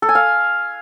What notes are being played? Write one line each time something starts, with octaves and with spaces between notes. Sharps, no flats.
A4
G#5
F5